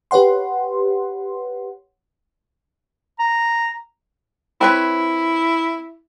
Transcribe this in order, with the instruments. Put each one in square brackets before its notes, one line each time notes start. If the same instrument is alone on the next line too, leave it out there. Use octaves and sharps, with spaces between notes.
[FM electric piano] G4 B4 C#5 F#5 C6
[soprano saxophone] A#5
[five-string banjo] C4 B4 C#5 [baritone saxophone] E4